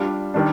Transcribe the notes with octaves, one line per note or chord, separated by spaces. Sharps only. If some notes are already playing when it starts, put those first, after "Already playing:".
Already playing: G3 D4 F4
D#3 G3 D4